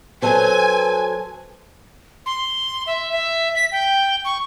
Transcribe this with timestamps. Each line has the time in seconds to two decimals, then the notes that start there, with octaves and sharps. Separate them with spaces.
0.22 F#3 A4 B4 C5 G#5
2.26 C6
2.87 E5
3.12 E5
3.56 B6
3.72 G5
4.25 C#6